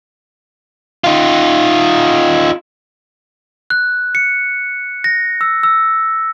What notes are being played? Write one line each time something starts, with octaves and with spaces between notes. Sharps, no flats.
D#4 F4
F#6
C#7
A#6
E6
E6